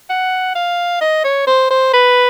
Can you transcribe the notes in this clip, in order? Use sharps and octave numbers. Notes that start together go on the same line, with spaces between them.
F#5
F5
D#5
C#5
C5
C5
B4